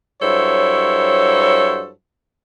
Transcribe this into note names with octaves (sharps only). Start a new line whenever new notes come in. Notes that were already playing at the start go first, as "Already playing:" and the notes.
G2 F#3 E4 A4 C5 C#5